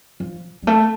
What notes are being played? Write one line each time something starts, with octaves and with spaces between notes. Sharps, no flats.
F3
G3
A3